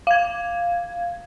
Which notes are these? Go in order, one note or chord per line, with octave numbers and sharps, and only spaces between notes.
F5 G#6